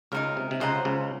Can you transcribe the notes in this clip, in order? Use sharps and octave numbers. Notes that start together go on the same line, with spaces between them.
C#2 C#3 D#4 F#4 A#4
C3
C3
C#2 C#3 C5 D#5 F#5 A#5
C#2 C#3